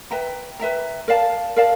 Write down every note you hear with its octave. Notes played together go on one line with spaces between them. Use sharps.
B4 E5 G5 A#5
B4 E5 G5 A#5
A#4 D5 F5 A5
A#4 D5 F5 A5